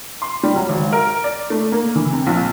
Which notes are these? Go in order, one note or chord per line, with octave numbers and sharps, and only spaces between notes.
C6
G3
F#3
G#1
A#4
D5
A3
A#3
E3
C3
A#1